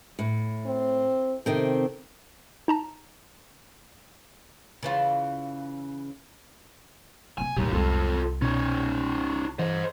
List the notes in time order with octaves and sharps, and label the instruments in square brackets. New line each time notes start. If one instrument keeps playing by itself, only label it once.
[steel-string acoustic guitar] A2
[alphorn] C4
[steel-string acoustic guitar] C3 D#3 C4 [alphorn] A4
[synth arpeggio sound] D#4 A5 A#5
[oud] C#3 E3 F4
[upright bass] C3 C4 [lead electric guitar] G#5
[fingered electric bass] A1 D#2 B2 [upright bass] G3 A#3 [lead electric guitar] D#4 G4
[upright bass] C2 [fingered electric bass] F2 G3 G#3 [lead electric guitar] F4 A4
[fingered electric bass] B2 [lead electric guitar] C#4 D#4
[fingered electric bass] E3 [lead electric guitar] C5 D#5